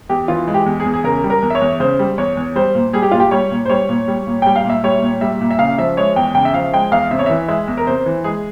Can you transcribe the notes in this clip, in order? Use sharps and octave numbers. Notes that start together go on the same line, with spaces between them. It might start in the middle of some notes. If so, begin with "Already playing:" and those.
E2 G4
E3 F4
G#3
G4
E2
G#4
E2
G#4
C#3 A#4
G3
A#4
E2
E5
C#5
E2
C#3 C5
G3
E2 C#5
E2
G3 C5
A#2
G3 G#4
G4
A#2 F4
G4
G3 C#5
A#2
C5
G3 C#5
A#2
G3
A#2
G3 G5
F5
A#2 E5
G3 C#5
A#2
G3 E5
A#2
E5
C#3 F5
F3 E5
G#3 C#5
E2 G5
C#3 G5
E5
F3 F5
G#3 G5
E2 F5
C3 E5
C#5
E3 E5
G#3 E5
E2
A#4
C3 C5
E3
G#3 G#4